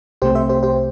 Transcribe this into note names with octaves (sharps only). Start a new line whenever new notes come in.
C2 C3 A3 C4 G4 C5
C5 E5
G4 C5
G4 C5